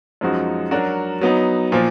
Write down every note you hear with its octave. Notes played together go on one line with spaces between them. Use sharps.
F#2 F3 G#3 D#4 F#4
F#3 D4 F#4 A#4
F#3 B3 D#4
A#2 F3